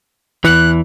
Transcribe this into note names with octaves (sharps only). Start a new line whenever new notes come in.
E2 E3 F#6